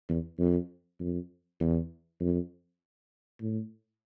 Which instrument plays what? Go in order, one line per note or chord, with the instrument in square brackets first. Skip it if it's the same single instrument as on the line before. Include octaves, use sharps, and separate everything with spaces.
[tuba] E2
F2
F2
E2
F2
A2